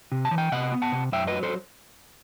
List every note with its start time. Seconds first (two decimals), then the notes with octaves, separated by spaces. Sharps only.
0.12 C3
0.25 A5
0.31 E3
0.38 G5
0.52 C3 D#5 F#5
0.72 B3
0.82 F#5 A5
0.92 C3
1.12 F#2 E5 G5
1.27 F#3 B4 D#5
1.43 A4 C5